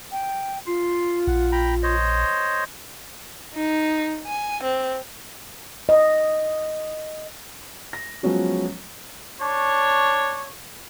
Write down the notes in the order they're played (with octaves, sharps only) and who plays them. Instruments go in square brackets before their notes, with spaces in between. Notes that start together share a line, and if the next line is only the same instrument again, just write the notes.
[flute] G5
[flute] F4 [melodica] C6
[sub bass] A#1 [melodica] F#5
[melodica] G5 A#5 B5
C5 C#5 D#5
[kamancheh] D#4
G#5
C4
[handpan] D#5
[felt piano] A#6
F3 F#3 G#3 B3 C#4 F#4
[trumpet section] D4 C#5